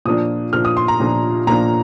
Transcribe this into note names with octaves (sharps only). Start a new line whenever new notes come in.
A#2 F3 A#3 D4 D#6
A#2 F3 A#3 D4 F6
D#6
C6
A#5
A#2 F3 A#3 D4
A#2 F3 A#3 D4 A#5